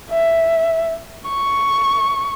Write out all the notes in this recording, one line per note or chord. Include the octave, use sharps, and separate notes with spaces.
E5
C#6